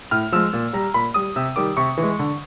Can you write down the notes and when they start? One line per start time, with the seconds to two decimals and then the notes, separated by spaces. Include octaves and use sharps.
0.11 A2 F6
0.32 F3 G#3 E6
0.53 A#2
0.73 G3 A#5
0.94 A#2 B5
1.14 G3 D#6
1.36 C3 E6
1.56 D#3 G3 D6
1.77 C3 C#6
1.98 E3 G#3
2.19 D3